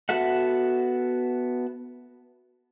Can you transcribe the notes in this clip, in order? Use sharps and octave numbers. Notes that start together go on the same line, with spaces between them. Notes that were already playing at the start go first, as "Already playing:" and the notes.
B3 F#4 A4 E5 F#5